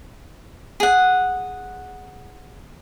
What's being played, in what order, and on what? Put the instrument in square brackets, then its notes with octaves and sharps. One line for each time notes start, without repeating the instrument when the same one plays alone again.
[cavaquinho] G#4 F#5